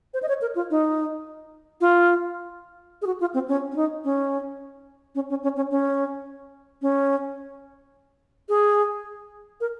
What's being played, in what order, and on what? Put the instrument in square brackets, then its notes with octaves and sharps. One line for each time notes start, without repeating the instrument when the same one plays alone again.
[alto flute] C5
D#5
C#5
A#4
F4
D#4
F4
G#4
F#4
F4
C4
C#4
C#4
D#4
C#4
C#4
C#4
C#4
C#4
C#4
C#4
G#4
A#4